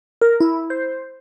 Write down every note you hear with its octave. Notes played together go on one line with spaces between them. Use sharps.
A#4
E4
C5